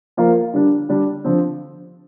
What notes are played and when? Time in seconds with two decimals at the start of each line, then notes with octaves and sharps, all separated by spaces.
0.17 F3 A#3 F4 A#4
0.53 D3 G3 D4
0.89 D3 G3 D4
1.24 D3 F3 C4